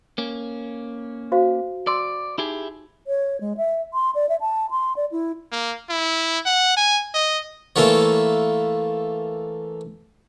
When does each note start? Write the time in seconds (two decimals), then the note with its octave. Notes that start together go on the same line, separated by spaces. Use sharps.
0.18 A#3 C#4
1.32 F#4 C5 F5
1.87 D5 C6 E6
2.38 D#4 E4 G4 G#4
3.07 C#5
3.41 G#3
3.57 E5
3.94 C6
4.15 D5
4.29 E5
4.41 A5
4.71 C6
4.96 D5
5.12 E4
5.52 A#3
5.90 E4
6.46 F#5
6.77 G#5
7.14 D#5
7.76 E3 A3 A#3 F4 C#5